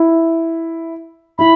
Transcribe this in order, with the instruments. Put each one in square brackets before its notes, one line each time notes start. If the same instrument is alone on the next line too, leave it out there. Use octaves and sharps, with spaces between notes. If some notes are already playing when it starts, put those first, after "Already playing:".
Already playing: [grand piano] E4
[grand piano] E4 [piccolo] B5